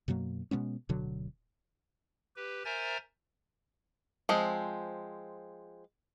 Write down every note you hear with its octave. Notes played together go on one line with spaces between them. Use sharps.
F#2 B2 F#3 A#3
B2 G#3 B3 C#4
D1 B2 D3 F#3
G4 B4
A#4 C5 E5 G#5 A#5 A6
F3 G#3 C4